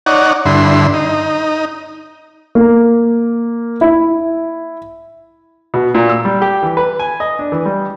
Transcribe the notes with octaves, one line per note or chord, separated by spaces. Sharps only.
D#4 C#5 D5 F#5
G2 D3 E4 C6
D#4
A#3
E4
B2
A#2
E6
G3
G4
E3
B4
G#5
D#5
D4
E3
G3